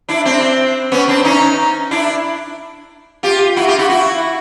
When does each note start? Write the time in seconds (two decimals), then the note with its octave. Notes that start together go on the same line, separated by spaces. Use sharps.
0.09 D4 E4
0.25 C4 D4
0.92 B3 C#4
1.08 C4 D4
1.24 C#4 D#4
1.91 D4 E4
3.23 F4 G4
3.56 E4 F#4
3.67 F4 G4
3.79 E4 F#4
3.89 E4 F#4